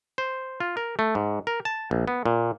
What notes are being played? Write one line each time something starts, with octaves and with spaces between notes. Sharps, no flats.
C5
F4
A#4
A3
G#2
A#4
A5
A#1
B3
A#2